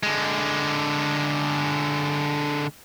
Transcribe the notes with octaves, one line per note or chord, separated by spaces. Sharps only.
D3 G#3